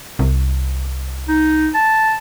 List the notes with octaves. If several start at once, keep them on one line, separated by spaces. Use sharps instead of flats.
C2
D#4
A5